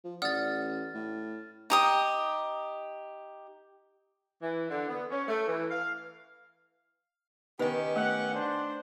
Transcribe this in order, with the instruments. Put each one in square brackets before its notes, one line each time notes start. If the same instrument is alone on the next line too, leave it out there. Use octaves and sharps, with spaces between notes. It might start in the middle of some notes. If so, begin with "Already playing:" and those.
[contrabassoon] F3
[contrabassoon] A1 [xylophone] D5 F#5 D#6 [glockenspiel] F6 A6
[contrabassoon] A2
[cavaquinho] D#4 G4 D#6
[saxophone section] E3
D3
B3
C#4
A3
E3
F5
[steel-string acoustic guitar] D#3 B3 [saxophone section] C#4 G4 [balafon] D#4 B4 D#5
[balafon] A3 [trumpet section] F#5
[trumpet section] D4 C5